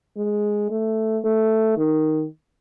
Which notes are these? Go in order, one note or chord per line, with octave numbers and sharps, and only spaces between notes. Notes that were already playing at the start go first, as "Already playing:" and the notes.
G#3
A3
A3
D#3